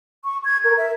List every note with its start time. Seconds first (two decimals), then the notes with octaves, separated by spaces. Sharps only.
0.24 C#6
0.45 G#6
0.64 A#4
0.78 E5